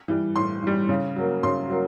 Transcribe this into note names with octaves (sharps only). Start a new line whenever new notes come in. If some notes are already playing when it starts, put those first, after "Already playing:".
E3 G3
A2 C6
E3 G3
C#3
F#3 A#3
C#3 C6
F#3 A#3